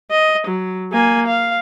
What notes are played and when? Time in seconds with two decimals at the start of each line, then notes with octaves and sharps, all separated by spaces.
0.11 D#5
0.47 F#3
0.92 A#3 G#5
1.27 F5